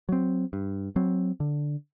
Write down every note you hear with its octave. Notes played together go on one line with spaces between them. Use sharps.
F#3 C4
G2
F#3 C4
D3